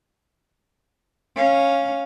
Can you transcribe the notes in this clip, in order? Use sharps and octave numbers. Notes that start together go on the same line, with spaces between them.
C#4 F5